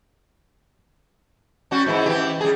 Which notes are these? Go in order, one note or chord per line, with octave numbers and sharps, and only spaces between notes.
G3 C#4 F#4
G#2 E3 E4
E3 G4
G3 G#4